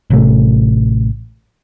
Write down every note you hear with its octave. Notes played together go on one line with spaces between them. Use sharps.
A1 C3 A3